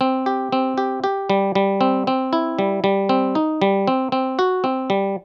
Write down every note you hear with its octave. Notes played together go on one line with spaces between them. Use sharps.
C4
G4
C4
G4
G4
G3
G3
C4
C4
E4
G3
G3
C4
D#4
G3
C4
C4
F#4
C4
G3